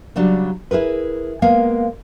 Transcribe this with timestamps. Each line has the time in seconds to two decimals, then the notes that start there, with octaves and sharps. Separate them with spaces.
0.16 C#3 F#3 G3 D4
0.71 E4 G#4 A#4 B4
1.42 G#3 A#3 B3 A#4 F5